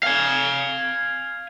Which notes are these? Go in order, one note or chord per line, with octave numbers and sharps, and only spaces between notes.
F5 G#5